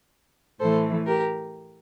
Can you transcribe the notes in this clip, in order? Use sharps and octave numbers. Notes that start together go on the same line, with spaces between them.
A2 E3 A3 A4 C5
G4 A#4